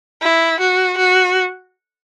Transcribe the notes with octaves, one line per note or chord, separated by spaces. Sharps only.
E4
F#4
F#4